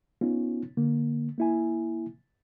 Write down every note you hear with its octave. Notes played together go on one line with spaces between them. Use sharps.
B3 C#4 D#4 F4
D3 A#3
A#3 E4 G#5